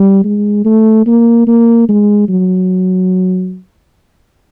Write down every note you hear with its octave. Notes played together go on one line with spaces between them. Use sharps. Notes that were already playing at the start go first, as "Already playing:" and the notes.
Already playing: G3
G#3
A3
A#3
A#3
G#3
F#3